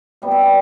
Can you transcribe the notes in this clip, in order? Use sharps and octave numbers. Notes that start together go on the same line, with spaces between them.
C3 G3 B3 F5
E5
D5